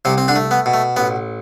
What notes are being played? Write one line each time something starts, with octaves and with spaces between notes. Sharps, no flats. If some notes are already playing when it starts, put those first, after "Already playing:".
C2 C3 C4
C4
D3 D4
A3
B3
B2
A3
A1 B3